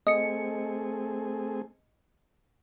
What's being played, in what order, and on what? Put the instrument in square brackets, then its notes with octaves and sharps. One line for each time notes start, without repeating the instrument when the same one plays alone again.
[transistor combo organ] A3 C4 G#4 [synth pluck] D#5 C#7